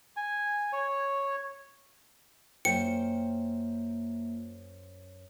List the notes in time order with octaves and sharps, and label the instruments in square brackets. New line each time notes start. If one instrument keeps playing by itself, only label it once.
[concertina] G#5
C#5
[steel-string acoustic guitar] F#2 C5 G5 [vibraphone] A#3 F4 E5 [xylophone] C#7